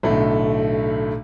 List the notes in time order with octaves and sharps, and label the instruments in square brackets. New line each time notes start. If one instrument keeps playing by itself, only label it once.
[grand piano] B1 A2 D3 A3